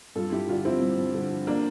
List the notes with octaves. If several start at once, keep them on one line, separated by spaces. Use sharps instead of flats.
G2 F4 A4
G2 E4 G4
D3 D4 F4
F3 C4 E4
G2
G2
D3
F3
A#3 D4